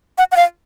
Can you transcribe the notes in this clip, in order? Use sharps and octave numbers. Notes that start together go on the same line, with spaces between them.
F#5
F#5
F5